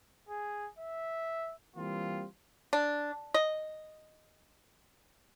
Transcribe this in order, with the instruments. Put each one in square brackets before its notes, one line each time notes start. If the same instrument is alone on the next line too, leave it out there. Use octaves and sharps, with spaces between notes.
[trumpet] G#4
E5
[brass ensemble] E3 G3 A#3 C4 F4
[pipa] D4
D#5